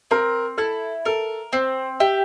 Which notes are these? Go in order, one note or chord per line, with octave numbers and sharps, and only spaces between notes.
C4 A#4
E4 A4
A4 A#4
C4 C5
G4 E5